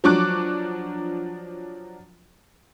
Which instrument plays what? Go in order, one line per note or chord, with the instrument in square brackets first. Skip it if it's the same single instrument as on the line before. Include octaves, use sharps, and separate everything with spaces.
[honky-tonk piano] F3 F#3 D4 C#6 D6 F#6